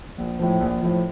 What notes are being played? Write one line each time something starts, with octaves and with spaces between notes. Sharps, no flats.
A#1
A2 F3
A#1
A2 F3